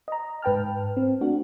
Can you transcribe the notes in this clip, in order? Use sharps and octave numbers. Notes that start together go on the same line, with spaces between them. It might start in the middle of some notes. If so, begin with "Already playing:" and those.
D#5 A#5
G#2 B4 G5 A5 F6
C4
A3 D4 F#4